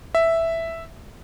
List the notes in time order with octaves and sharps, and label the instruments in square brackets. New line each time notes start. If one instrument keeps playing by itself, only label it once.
[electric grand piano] E5